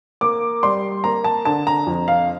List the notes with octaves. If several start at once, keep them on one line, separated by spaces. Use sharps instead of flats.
A#3 D6
G3 C6
A#3 A#5
A5
D3 A5
A#5
F2
F5